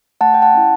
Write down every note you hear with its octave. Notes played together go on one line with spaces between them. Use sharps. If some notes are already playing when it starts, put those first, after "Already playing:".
A3 F#5 A5
G5
F#5 A5
C#4 E4